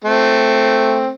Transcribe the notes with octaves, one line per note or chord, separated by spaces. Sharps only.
A3 C4